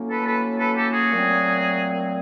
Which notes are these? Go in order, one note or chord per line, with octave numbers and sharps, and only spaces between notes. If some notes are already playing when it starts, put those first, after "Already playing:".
Already playing: A2 F#3 A#3 C#4
A4 B4
A4 B4
A4 B4
G4 A4
F#4 G#4
A#2 F#3 A3 C4